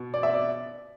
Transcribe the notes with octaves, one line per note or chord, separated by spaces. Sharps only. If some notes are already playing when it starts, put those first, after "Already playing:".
Already playing: B2
D5
E5
D5